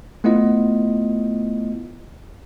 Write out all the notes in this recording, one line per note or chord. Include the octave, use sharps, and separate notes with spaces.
A3 B3 E4 F4 D#5